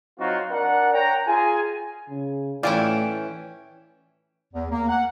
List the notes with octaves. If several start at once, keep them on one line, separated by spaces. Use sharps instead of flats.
F#3 C4 D#4 F4 F#4
D4 A#4 F#5
C#5 G5 A#5
F4 G#4 G#5
C#3
A2 E3 C#4 E4 F4 D5 G5
E2
A#3
F#5